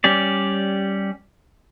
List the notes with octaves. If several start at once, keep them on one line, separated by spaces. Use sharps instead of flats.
G3 C#4 G4 D5